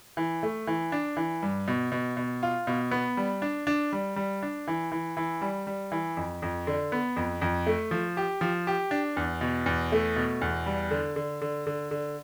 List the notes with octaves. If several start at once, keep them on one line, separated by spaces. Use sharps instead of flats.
E3
A3
E3
D4
E3
G2
B2
B2
B2
F4
B2
B3
G3
D4
D4
G3
G3
D4
E3
E3
E3
G3
G3
E3
F2
F2
D3
B3
F2
F2
A3
F3
G4
F3
G4
D4
E2
B2
E2
A3
B2
E2
G3
D3
D3
D3
D3
D3